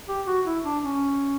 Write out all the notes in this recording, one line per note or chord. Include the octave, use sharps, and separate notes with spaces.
G4
F#4
E4
D4
C#4